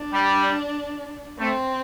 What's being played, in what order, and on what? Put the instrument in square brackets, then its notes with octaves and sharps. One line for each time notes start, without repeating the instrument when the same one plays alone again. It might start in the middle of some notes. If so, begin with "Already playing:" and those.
Already playing: [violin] D4
[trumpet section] G3
[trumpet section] A3 [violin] C4